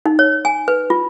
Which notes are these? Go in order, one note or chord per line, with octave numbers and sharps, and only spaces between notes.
D#4
C#5
G#5
B4
F4